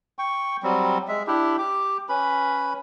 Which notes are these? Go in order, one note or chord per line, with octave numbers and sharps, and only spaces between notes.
G5 C#6
F#3 G3 C4
G#3 E5
D4 E4 G4
G4 D6
C#4 B4 B5